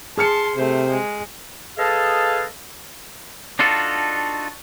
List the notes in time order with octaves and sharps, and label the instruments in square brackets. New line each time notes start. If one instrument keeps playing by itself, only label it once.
[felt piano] G#4 F6 C#7 [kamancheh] A5 C6
[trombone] C3 [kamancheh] A3 C5
[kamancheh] G#3
[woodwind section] G#4 A4 B4 D#5 F5 A5
[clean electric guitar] D4 D#4 F4 F#4 A4